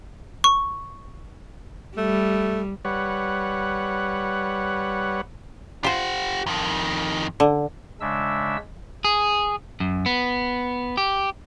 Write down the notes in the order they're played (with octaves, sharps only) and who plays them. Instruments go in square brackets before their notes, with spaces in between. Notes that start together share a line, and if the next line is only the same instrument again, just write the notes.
[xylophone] C#6
[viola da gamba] G3 [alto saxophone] A3
[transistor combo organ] G3 B4 C#5 F#5
[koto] F4 C5 [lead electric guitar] G4 F#5
[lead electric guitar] F2 D#3
[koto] D3
[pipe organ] C#3 G#3 D4 E5 E6
[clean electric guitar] G#4
F#2
B3
G4